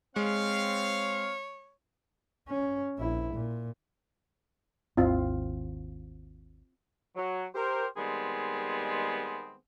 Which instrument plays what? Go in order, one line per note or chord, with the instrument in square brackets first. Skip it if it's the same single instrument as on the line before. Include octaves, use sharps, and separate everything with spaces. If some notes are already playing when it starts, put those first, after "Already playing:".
[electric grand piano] G#3 [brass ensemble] C4 F5 [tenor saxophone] C#5
[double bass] C#4
A#1 E4
A#2
[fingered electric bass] G#1 D#2 D#3 [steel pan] C4 E4 F4
[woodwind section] F#3
G4 A#4 C5
D#3 G3 G#3 B3 C4 G#4